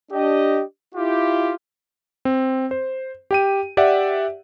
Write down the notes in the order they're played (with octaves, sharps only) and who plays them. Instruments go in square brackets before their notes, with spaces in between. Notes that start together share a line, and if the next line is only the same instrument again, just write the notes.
[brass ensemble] D4 G4 D#5
E4 F4 G4
[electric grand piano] C4
C5
G4 G5 D#7
G4 D5 E5 F#5